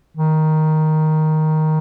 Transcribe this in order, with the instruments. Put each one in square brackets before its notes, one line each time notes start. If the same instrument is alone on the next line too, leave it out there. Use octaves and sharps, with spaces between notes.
[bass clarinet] D#3